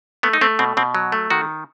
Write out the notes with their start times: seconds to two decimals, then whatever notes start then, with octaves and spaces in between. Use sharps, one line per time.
0.23 A3 B3
0.33 D#4
0.41 A3 C4
0.59 B2 C4
0.77 B2 C4
0.95 F#3
1.12 A3
1.30 D#3 F#4